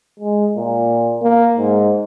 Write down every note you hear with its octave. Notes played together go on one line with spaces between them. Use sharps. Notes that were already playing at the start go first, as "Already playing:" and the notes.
G#3
A#2
A#3
G#2